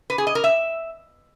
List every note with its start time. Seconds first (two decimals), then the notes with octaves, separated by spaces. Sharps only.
0.10 B4
0.18 G#4
0.27 D#5
0.35 A#4
0.44 E5